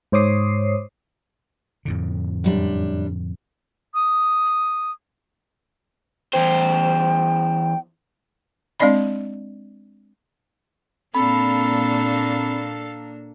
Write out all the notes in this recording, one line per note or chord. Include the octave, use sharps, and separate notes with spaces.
G#2 C5 C#5 D6 D#6 C7
F2 A2 D3
F#2 G3 D4
D#6
E2 C5 G5
G#3 C4 D4 D5 D#5 B5
A#2 A#3 C4 D4 A4 F5 B5